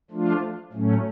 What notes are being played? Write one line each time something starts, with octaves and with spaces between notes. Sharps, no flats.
F3 A3 D4 F4
A2 F#3 A3 C#4